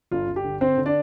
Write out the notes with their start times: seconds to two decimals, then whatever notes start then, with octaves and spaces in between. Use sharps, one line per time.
0.11 G1 F4
0.28 G1
0.36 G4
0.44 D3
0.61 D3 C4 C5
0.78 D3
0.86 D4 D5